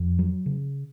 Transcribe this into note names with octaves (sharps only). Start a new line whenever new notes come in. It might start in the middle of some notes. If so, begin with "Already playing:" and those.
Already playing: F2
F#3
C#3